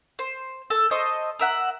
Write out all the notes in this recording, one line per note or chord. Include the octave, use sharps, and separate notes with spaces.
C5
A4
C5 D#5 A5 C#6
A#4 E5 F#5